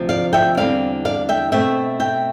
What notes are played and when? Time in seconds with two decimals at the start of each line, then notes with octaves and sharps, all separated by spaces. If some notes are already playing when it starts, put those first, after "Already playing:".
Already playing: D2 C3 F3
0.09 D5 F5
0.33 E5 G5
0.57 E2 D3 G3 C4 D5 F5
1.05 D5 F5
1.29 E5 G5
1.52 B2 A3 C4 E5 G5
2.00 E5 G5